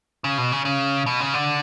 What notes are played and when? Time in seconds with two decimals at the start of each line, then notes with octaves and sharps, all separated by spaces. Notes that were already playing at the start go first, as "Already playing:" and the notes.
0.24 C#3
0.38 B2
0.52 C#3
0.65 C#3
1.06 B2
1.20 C#3
1.34 D3